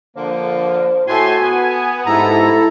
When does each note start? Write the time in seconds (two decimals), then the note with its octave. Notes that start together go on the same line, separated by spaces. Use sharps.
0.17 D3 F3 A#3 C5
1.07 A2 F#4 A4 G#5 C6
1.42 B3
2.06 G#2 E4 G4 A4 A#5